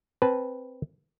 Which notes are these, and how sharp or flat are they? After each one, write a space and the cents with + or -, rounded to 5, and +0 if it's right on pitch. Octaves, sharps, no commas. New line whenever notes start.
C4 +0 B4 +0 A5 -25